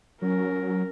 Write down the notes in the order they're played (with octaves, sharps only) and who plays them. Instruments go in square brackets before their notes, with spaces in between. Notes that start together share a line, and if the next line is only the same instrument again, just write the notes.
[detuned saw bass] F#3 [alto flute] C#4 [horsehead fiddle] A#4